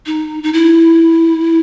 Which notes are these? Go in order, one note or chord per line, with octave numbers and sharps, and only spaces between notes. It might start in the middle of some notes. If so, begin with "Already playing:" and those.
D#4
D#4
E4